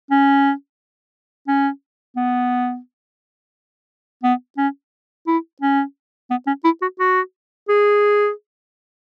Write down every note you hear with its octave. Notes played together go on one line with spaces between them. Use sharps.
C#4
C#4
B3
B3
C#4
E4
C#4
B3
C#4
E4
F#4
F#4
G#4